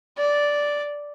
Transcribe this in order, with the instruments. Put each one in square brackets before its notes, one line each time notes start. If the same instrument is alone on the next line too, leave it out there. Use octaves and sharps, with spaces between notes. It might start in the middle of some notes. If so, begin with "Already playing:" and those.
[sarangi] D5